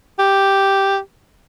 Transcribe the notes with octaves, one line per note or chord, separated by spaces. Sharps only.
G4